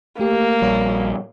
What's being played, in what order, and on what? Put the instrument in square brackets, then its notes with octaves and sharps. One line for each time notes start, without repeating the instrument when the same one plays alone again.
[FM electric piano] A3 G4 [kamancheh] A#3
[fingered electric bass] A#1 G3 [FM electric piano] F#4 C#5